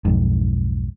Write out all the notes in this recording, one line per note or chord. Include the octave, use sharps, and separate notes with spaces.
B1 F2 G#2